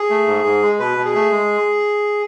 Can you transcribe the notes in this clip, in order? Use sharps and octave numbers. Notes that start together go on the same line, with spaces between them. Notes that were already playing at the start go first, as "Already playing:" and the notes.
Already playing: G#4
A3
G#2
G#2
G#3
B2 B4
B2
G#4
A3
G#3